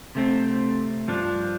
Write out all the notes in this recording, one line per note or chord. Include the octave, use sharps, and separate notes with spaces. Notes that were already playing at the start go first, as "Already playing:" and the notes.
C3 A3 C4
G2 F3 D4